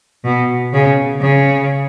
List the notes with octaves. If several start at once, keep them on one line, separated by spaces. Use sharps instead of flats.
B2
C#3
C#3